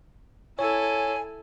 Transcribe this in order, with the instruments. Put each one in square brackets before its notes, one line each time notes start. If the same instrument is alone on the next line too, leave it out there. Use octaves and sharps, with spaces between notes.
[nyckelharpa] E4 A4 [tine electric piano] C#5 [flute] G#5